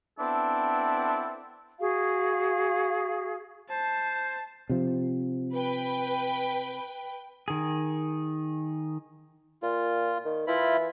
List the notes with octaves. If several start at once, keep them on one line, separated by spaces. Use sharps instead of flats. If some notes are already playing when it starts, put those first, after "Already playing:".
B3 C4 D4 E4 A4
F#4 G#4 F5
C5 A5
C3 F3
B4 G5
D#3 G#4
A#2 F4
D#3
E3 E4 F4 B5